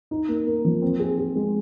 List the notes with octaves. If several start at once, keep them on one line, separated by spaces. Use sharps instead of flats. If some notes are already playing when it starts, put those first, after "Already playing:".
D#4
A#3
A#3
F3
C4
G#4
G#4
G#3